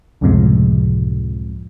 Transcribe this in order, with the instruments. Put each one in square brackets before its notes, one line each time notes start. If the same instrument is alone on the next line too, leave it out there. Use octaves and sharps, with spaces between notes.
[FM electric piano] C#2 F#2 A2 C3 F3 G#3